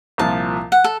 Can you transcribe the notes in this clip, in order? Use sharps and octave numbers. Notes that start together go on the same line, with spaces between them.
C2 A#2 F3 A5
F#5
A4